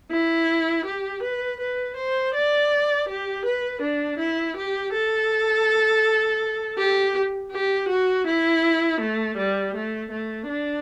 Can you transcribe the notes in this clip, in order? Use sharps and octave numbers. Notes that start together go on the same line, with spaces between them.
E4
G4
B4
B4
C5
D5
G4
B4
D4
E4
G4
A4
G4
G4
F#4
E4
A3
G3
A3
A3
D4